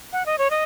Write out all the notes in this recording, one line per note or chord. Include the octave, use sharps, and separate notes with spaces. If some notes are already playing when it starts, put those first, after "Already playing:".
F#5
D#5
C#5
D#5